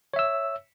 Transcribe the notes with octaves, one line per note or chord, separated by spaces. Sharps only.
C#5 E5 E6